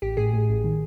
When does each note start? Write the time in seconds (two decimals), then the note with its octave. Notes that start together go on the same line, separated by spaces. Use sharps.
0.02 A1 G4
0.17 A2 G#4
0.33 A2
0.49 A1
0.64 D#3